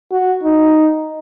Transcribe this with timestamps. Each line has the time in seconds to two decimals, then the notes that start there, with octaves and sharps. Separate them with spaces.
0.12 F#4
0.43 D#4